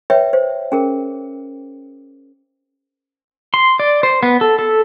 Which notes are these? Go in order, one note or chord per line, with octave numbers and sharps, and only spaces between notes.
B4 C#5 E5 G5
C5
C#4 G#4 A#4
C6
D5
C5
B3
A4
A4